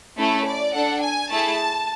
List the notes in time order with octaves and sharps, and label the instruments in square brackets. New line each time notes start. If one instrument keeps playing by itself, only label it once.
[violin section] A3 C#4 E4 A4
D5
D4 A4 F#5
G#5
A3 E4 G#4 A5